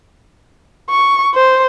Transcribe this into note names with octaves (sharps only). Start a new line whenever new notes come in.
C#6
C5